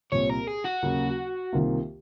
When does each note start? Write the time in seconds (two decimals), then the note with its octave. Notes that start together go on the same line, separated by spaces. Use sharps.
0.12 C2 A#2 F3 C4 C#5
0.29 A#4
0.47 G#4
0.64 F#4
0.82 D#2 C#3 F#3 A#3
1.53 C2 C3 D#3 A#3 F4